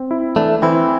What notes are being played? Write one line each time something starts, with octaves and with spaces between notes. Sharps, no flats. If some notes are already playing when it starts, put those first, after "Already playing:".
Already playing: C4
E4
E3 A3 D4
E3 C4 E4